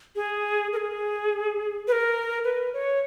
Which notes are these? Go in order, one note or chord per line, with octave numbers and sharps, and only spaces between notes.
G#4
A#4
G#4
B4
A#4
B4
C#5